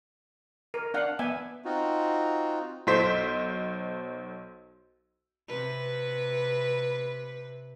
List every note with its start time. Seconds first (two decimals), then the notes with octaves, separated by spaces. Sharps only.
0.74 A#4
0.94 D4 F5 F#5
1.19 B3 E5 G#5
1.65 C4 D#4 F4 F#4
2.87 B1 A4 C5 B6
5.48 C3 B4